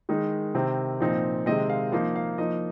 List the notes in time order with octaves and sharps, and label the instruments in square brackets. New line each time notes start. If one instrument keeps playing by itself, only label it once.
[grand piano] D#3 G#3 D#4
C3 D#3 C4
A#2 F3 C4 D#4
C3 D#3 G#3 C4 D#5
F5
F3 A#3 D#4 F5
F5
F3 A#3 D#4 D#5